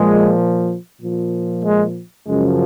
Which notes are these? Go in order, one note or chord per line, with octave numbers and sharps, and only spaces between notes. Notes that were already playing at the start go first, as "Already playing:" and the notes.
Already playing: A#2 F3 G#3
A#2 F3
G#3
F#2 C#3 F3 G#3